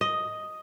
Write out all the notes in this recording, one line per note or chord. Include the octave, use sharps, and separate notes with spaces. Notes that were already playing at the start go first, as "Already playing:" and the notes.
D#5